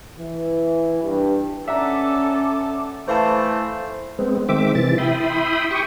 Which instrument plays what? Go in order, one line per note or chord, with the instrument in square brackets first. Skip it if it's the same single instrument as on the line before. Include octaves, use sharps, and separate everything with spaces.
[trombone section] E3
G2
[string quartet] C#4 A4 [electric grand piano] D5 F#5 A#5 [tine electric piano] E5 [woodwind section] D6
[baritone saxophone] E3 [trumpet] A3 [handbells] C5 F5 A5
[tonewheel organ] G#3 B3 C4
D#3 G#3 C4 E5 D6
C3 E3 A6
E4 E5 G5 B5 C6 D#6
G4 G5 C#6 D#6